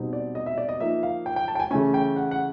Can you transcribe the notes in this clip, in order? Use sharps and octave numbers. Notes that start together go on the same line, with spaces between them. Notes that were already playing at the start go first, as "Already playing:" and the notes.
Already playing: B2 G3 C4 D#4
D5
D#5
E5
D5
D#5
F3 A#3 D#4 E5
F5
G5
G5
A5
G5
G#5
C#3 E3 A3 C#4 G#5
G5
F#5
F#5